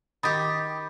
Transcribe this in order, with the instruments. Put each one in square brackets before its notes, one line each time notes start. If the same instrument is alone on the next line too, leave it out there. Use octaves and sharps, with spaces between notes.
[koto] D#3 G4 [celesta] B5 D#6 A6